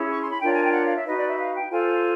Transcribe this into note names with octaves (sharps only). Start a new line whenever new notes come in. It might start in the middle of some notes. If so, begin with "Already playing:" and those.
Already playing: C#4 E4 G#4
C#6
C6
B5
D4 F4 A#4 C#5 G5
G#5
G5
F#5
F5
E5
D#4 F#4 B4 D#5
D5
E5
F5
G5
F4 A4 C5 G#5